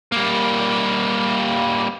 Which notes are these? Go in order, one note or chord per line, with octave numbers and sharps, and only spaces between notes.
G3 A#3